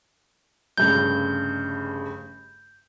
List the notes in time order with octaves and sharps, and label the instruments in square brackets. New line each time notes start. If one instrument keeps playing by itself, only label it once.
[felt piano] F1 G2 C#3 [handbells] G6